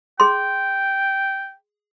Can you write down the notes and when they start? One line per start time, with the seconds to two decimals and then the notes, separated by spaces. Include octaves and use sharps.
0.20 G#4 G5 C6